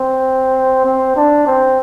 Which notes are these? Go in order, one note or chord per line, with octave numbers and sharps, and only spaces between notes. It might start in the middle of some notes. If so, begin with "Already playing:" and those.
Already playing: C4
C4
D4
C4